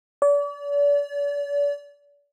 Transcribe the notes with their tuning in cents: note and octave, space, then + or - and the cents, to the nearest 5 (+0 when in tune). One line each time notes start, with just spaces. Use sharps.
D5 -40